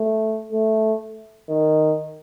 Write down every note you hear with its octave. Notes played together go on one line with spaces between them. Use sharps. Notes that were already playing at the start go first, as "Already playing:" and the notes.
Already playing: A3
A3
D#3